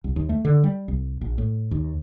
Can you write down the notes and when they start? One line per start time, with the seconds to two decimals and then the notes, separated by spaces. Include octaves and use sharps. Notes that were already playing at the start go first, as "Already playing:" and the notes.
0.04 C2
0.16 D#2
0.29 A3
0.45 D3
0.64 G3
0.88 C2
1.21 A#1
1.38 A2
1.71 D#2